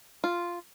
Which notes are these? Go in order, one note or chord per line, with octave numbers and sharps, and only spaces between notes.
F4